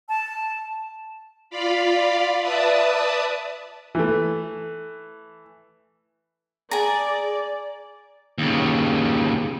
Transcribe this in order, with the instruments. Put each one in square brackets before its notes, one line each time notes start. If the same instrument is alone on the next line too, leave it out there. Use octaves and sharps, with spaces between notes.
[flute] A5
[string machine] F4 D5 F5 B5
B4 D5 E5 A5 D#6
[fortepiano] E3 A3
[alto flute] G#4 [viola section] D5 [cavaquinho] G#5 A#5
[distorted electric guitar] D#2 C#3